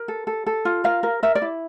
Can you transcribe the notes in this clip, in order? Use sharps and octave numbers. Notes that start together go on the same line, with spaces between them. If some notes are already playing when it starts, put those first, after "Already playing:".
Already playing: A#4
A4
A4
A4
F4
A#4 F5
A#4
A#4 E5
D5
E4